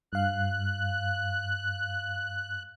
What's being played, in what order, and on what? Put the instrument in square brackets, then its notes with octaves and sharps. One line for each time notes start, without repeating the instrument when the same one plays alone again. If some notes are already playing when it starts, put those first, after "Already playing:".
[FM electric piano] G2 F5 [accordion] F#6